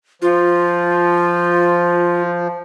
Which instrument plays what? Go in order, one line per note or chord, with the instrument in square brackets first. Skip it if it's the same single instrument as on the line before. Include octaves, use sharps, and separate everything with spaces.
[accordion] F3 [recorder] F4